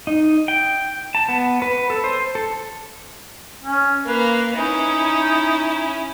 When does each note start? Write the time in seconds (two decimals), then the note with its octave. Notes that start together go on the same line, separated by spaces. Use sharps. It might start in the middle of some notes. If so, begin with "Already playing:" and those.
0.07 D#4
0.48 G5
1.15 A5
1.28 B3
1.62 B4
1.90 A4
2.04 C5
2.35 A4
3.63 C#4
4.05 A#3 B4 F5
4.55 C#4 D#4 E4